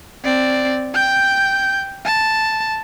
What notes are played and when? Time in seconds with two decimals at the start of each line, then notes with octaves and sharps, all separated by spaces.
0.24 C4 D5
0.95 G5 G6
2.05 A5